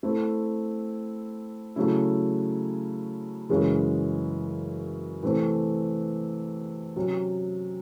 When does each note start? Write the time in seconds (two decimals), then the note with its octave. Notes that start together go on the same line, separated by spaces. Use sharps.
0.03 A3 C4 E4
1.76 C#3 F#3 A3 C#4 E4
3.49 F#2 C#3 E3 G#3 C#4
5.23 C3 E3 A3 C4
6.96 C3 F#3 C#4